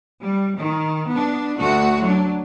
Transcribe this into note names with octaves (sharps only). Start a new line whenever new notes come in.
G3
D#3
B3 D4
D2 A3 F#4
F#3 D4